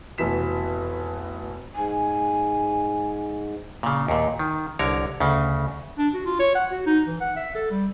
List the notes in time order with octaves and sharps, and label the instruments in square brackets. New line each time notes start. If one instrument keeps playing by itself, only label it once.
[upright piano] F1 B2 E3 B6 E7
[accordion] G#2 [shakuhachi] G#5
[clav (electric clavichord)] A#2 C#3
D#2 A#2
D#3
C2 D3 A#4 C#5
D2 C#3
[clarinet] D4
F#4
F4
C#5
F#5
F#4
D#4
E3
F#5
E5
A4
G3